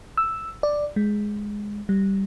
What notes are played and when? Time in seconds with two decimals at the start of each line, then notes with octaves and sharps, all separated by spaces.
0.17 E6
0.63 D5
0.96 G#3
1.89 G3